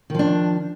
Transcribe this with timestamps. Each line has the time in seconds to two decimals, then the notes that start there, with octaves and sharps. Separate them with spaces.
0.10 D#3
0.14 F3
0.19 D4